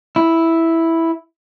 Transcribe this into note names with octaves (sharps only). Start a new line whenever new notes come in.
E4